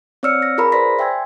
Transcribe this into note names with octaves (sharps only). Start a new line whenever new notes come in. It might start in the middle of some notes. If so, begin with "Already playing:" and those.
C4 C#5 D5 E6 F6 C#7
A#6
F4 G#4 A#4 A#5 B5
B4 C5 D5 C6 A#6 B6
E5 G5 G#5 C6 E6 G#6